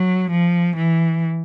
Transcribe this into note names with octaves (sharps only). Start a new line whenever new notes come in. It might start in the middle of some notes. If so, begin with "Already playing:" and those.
Already playing: F#3
F3
E3